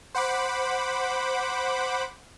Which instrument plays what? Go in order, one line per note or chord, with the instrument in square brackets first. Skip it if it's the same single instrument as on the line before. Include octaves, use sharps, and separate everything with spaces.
[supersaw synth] C5 F#5 B5 D6